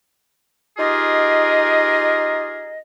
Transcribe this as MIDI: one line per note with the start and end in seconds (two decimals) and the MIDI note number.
0.78 2.78 63
0.78 2.78 65
0.78 2.78 67
0.78 2.78 68
0.78 2.78 70
0.78 2.78 75